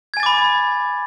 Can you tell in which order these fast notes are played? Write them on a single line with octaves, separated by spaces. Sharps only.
G#6 G#5 A6 D6 B5